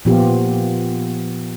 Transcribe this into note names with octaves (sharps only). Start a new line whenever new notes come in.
A#2 F3 B3 F4 G4